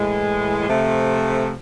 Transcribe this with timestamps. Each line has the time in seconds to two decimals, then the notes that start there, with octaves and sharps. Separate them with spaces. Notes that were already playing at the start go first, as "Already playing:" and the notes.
Already playing: A2 E3 G#3
0.67 C3 F3 A3